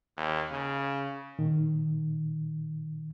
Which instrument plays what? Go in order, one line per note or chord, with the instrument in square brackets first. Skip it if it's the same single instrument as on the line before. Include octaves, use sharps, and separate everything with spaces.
[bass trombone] D#2
C#3
[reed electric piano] A#2 D#3